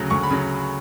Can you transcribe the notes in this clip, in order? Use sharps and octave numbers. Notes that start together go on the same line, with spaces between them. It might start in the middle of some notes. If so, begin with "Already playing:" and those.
Already playing: D2 C#3 F#3
D2 C#6
B5
C#3 F#3